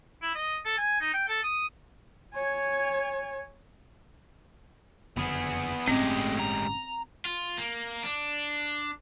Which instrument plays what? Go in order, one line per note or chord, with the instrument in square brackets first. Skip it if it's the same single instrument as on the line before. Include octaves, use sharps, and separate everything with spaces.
[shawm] E4
D#5
A4
G#5
D#4
G5
A4
D#6
[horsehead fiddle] C#5 G#5
[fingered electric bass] F#1 F2 D3 [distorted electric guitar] B3 G#4
[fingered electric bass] G1 A2 C#4 [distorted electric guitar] G#3 G4 [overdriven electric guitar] A3 D#5 [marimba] C4
[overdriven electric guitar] A#5
F4
A#3
D4